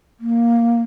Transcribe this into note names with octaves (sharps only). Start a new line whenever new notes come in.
A#3